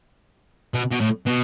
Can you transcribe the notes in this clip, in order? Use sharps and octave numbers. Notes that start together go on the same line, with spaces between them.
B2
B2
A2
B2